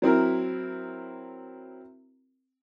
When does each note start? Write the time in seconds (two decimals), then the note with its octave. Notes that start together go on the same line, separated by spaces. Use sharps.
0.02 F#3 C4 E4 A#4